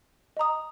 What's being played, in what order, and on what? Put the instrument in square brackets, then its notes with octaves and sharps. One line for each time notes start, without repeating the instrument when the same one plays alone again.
[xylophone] D#5 A#5 D#6